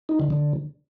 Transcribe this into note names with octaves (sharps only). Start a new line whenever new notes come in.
D#4
D3
D3